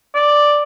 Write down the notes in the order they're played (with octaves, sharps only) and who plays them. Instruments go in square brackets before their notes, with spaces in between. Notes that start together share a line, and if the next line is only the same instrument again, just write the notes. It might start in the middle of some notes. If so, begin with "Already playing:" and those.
[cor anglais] D5